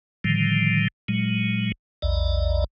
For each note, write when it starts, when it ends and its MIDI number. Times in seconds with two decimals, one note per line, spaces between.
0.24 0.88 45
0.24 0.88 50
0.24 0.88 51
0.24 0.88 53
0.24 0.88 55
1.08 1.72 46
1.08 1.72 54
1.08 1.72 56
2.02 2.64 34
2.02 2.64 40
2.02 2.64 74
2.02 2.64 75